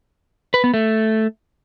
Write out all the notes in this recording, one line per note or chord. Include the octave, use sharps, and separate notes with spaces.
B4
B3
A3